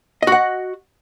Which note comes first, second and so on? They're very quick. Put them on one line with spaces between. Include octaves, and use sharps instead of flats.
D#5 F#4 F#5